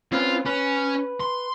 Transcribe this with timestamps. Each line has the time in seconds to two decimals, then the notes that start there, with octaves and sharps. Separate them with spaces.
0.13 C4 C#4 F4 B4
0.46 C#4 B4
1.20 C6